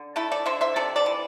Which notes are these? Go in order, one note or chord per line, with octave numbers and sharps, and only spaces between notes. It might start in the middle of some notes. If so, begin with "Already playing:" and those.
Already playing: D3
A3 E4 A4
A4 D5
D3 C5 E5
C5 E5
C3 A4 D5
A4 D5
E3